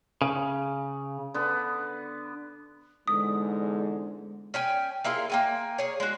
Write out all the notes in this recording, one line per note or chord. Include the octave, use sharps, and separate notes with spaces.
C#3
D3 B3
E2 G#2 D3 G#3 D#6
C#4 G5 G#5
A#3 E4 F4 G#4
A#3 G5 G#5
G#4 C#5
G#3 F#4